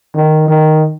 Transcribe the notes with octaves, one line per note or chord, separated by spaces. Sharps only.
D#3
D#3